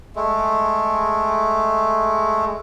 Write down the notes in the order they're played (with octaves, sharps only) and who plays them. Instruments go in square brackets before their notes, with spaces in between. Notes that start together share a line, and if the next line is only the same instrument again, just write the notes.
[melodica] G#3 A3